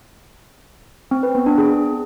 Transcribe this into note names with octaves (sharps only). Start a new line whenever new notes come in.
C4
B4
B3
D4
G#4